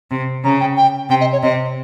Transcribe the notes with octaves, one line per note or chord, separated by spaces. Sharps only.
C3
C#3 A#5
G5
G5
C3 G5
D#5
C#5
C3 D#5